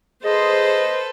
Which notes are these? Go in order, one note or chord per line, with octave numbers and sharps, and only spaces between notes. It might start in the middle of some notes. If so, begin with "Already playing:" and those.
G#4 A4 B4 C5 D#5